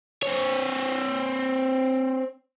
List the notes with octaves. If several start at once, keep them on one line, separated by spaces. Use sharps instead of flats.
C4 C#5